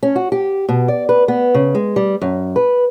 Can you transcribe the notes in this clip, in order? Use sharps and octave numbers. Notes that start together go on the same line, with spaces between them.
C#4
F#4
G4
B2
D5
B4
B3
C#3
G#3
G3
F#2
B4